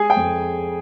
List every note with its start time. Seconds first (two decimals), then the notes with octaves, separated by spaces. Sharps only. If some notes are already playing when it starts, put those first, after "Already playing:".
Already playing: G#3 G#4 G#5
0.10 G5
0.16 F2